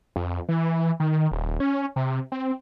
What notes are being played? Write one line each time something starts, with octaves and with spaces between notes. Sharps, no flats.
F2
E3
D#3
D#1
C#4
C3
C4